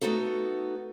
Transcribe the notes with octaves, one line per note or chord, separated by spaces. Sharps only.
A3 B3 C4 D#4 F#4 A4